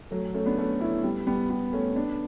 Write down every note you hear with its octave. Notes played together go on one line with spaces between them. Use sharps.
F#3 A3
A3 C#4
B3 D4
A3 C#4
C#4 E4
G3 B3
G3 B3
G3 B3
A3 C#4
C#4
B3 D4